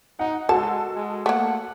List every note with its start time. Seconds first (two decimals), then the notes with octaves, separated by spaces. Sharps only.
0.19 D#4 F#5
0.49 G#3 F#4 A4 A5
0.95 G#3
1.26 A3 A#3 F#5